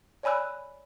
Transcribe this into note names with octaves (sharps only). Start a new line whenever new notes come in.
C#5 D5 G#5 B5 E6 F#6